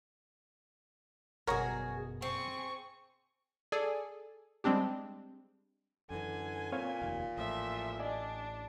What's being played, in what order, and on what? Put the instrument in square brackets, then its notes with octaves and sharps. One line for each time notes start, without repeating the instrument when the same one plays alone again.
[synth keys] G1 F#2 B2 [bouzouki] F#4 G#4 [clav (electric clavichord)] A#4 C#5 A#5
[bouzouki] C4 [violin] G#4 C#6
[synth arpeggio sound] G#4 A4 D5 G#5
G3 G#3 C4 D4 G4
[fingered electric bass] F#2 E3 [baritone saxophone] D3 [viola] G#5
[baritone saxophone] A#2 [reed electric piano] C4 C#5 F5
[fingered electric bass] F1 D#2 [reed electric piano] F5
[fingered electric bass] A1 A2 [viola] F3 E5
[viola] D4 [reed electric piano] D5 D#5 G#5